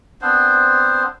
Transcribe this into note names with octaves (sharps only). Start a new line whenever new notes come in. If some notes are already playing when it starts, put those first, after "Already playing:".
B3 C4 D4 C5